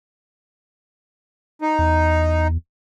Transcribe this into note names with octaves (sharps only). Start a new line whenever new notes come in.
D#4
E2